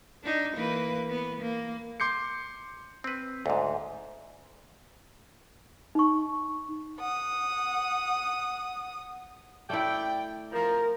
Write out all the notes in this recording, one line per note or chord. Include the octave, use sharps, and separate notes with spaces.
D4 D#4
E3 A#3 B4
B3
A#3
C6 D6 G6 C7 C#7
C4 B4
D2 G#2
D#4 C#6
F#5 D#6
A3 E4 D5 G5
F3 A#4